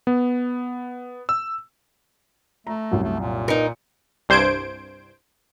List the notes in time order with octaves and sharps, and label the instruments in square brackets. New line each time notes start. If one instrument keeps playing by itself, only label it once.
[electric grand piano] B3
E6
[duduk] A3 [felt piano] A#5
[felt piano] C2 F#2
[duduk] A3
A#2
[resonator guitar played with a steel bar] D#4 A#4 [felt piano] B4 C#7
[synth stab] C2 G2 C5 G6 G#6 D7